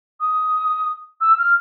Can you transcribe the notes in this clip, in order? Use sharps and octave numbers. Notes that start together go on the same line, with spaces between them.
D#6
E6
F6